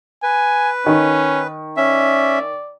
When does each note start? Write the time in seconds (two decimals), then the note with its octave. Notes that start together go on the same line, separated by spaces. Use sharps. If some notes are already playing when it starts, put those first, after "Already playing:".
0.23 B4 G#5
0.86 D#3 C#4
1.77 C#4 D5 E5